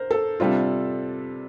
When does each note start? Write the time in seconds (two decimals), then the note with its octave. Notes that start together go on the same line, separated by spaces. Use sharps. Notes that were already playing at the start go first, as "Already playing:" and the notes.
Already playing: A#4 C5
0.11 A4
0.40 C3 G3 D4 F4